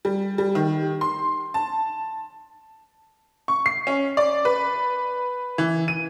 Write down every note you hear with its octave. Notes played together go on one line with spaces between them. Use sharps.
G3
G3
D#3
C6
A5
C#6
C7
C#4
D5
B4
E3
D#7